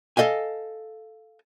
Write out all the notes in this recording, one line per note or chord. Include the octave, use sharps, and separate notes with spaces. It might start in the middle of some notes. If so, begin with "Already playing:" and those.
A4 D#5 F5 G#5